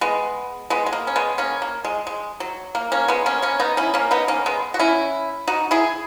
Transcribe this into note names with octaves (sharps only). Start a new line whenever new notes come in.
G#3 B3
G#3 B3
G#3
A#3
C#4
G#3 B3
A#3 C#4
A#3
G#3
G#3
F#3
A#3
A#3 C#4
G#3 B3
A#3 C#4
A#3 C#4
B3 D#4
C#4 E4
A#3 C#4
B3 D#4
A#3 C#4
G#3 B3
F#4
C#4 E4
D#4 F#4
E4 G#4